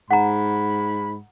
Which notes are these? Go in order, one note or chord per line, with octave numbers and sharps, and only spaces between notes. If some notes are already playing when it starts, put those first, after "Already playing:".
G#2 F#5 A#5 B5